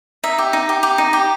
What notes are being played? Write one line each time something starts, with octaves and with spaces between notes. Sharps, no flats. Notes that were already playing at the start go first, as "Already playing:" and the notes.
D#4 E5
G4
D#4
G4
G4
D#4
G4